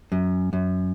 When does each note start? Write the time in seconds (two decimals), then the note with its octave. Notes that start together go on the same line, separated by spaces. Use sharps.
0.12 F#2
0.53 F#2